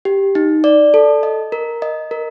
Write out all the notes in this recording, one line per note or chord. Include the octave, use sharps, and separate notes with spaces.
G4
D#4
D5
A4
D#5
A#4
D#5
A#4